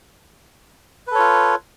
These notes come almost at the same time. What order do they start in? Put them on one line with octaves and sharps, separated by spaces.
B4 A4 C#5 F4